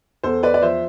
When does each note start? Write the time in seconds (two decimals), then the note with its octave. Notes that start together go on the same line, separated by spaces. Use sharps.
0.23 E2 A4 C5
0.43 B4 D5
0.54 D5
0.62 F3 C5 E5